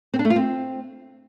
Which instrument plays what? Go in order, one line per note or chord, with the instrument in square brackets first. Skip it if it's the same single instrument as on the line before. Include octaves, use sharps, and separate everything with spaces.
[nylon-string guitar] C4
D4
A3
F4
C4